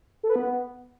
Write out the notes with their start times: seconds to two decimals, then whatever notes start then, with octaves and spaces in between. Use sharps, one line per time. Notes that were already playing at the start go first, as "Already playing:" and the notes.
0.23 A4
0.30 B4
0.36 B3